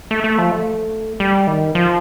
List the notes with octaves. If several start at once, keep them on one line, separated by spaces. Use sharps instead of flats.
A3
A3
F3
A3
G3
D#3
F3